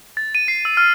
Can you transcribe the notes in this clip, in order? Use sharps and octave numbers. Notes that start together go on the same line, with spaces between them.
A6
D#7
C7
E6
F6